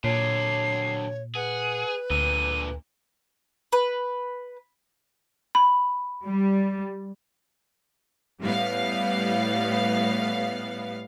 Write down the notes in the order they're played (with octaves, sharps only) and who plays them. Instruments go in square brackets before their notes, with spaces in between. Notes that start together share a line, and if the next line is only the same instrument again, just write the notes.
[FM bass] A#2 [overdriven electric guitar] D3 F#3 [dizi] C#5 [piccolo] C7
[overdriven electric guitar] G#4 [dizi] B4 [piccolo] F#5
[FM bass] D2 [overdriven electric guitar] A#2 D3 [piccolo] D#7
[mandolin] B4
[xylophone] B5
[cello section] G3
[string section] A2 G3 B3 F5